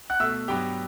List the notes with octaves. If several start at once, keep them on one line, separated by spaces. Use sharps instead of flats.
F#5 F#6
B2 A3 E5 E6
G2 F#3 B3 G4 G5